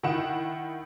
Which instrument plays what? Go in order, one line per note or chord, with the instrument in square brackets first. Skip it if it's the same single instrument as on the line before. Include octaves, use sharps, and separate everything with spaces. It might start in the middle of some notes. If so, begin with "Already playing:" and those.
[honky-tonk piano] D#3 E4 F#5 E7